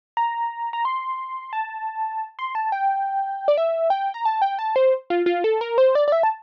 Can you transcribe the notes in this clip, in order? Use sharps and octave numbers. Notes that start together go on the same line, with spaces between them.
A#5
A#5
C6
A5
C6
A5
G5
D5
E5
G5
A#5
A5
G5
A5
C5
F4
F4
A4
A#4
C5
D5
D5
E5
A5